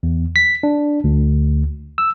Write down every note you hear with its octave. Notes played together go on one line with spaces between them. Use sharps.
E2
B6
D4
D2
E6